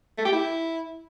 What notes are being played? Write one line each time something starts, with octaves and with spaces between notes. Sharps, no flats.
A3
G4
E4